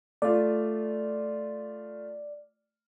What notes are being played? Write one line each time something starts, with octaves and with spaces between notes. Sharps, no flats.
A3 F4 D5